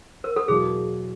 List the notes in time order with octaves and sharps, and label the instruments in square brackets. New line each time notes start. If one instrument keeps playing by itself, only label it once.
[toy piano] A#4
A4
[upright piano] E2 B2 F#3 A#3 [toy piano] G#4